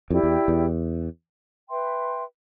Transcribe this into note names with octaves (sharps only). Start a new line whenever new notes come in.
F2 E4 G4 D5 G5
E2
E2
B4 E5 G5 C6